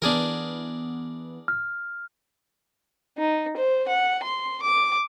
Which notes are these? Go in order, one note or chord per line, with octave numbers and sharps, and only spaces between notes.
E3 B3 D4 G#4 A#4
F6
D#4
C5
F#5
C6
D6